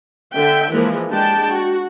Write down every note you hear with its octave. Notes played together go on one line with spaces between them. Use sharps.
D3 E5 G5
E3 F3 G#3 A#3
G#3 D4 G4 G5 A5
F#4